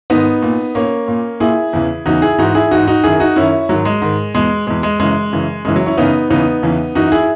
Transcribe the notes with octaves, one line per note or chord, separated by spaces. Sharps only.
G#2 D#3 B3 D#4
A#2
A#2 A#3 C#4
A#2
A#2 E4 G#4
E2 C#3 E3
E2 C#3 E3 D#4 F#4
E4 G#4
G#2 E3 D#4 F#4
E4 G#4
G#2 E3 D#4 F#4
D#4 F#4
F#2 D#3 E4 G#4
D#4 F#4
F#2 D#3 C#4 E4
G#2 D#3 F#3
G#3
G#2 D#3
E2 B2 G#3
E2 B2 G#3
G#3
F#2 C#3 E3 G#3
F#2 C#3 E3
F#2 C#3 E3 G#3
F#3
C#4 E4
F#2 C#3 E3 B3 D#4
E2 C#3 E3 B3 D#4
E2 C#3 E3
F#2 E3 D#4 F#4
E4 G#4